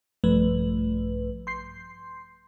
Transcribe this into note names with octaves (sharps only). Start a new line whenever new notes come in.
A#1 G2 F3 A3 B4
C6 G6 C7